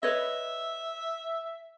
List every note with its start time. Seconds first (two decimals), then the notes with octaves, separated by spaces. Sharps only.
0.03 B4 C#5 D#5 E5